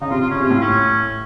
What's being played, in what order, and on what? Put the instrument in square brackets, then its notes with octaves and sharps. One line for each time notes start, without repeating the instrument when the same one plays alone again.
[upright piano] C#3 [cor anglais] D#4
[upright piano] C3 [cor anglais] F4
[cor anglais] F4
[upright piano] C#3 [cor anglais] C#4
[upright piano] C3
[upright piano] A2 [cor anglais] F4
[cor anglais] C#4